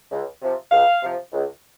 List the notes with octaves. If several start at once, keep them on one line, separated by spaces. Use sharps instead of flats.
C#2
C3 F3
C#2 F5
C3 F3
C#2